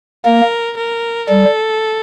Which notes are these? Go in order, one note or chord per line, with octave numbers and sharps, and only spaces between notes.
A#3 A#4
A#4
G3 A4